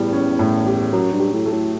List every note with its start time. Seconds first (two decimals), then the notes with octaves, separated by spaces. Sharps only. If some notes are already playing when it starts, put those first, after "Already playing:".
Already playing: E2 A2 G3
0.13 C#4
0.39 A2
0.66 G4
0.92 F#2 F#3
1.12 G2
1.20 G4
1.33 A2
1.46 A3
1.52 A2